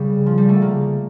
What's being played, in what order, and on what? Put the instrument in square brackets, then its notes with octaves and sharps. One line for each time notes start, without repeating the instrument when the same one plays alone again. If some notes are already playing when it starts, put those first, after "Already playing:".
Already playing: [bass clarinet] C#3 [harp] G3
[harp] F3
G3
A3
[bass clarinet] D3
[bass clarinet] C#3 [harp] A#3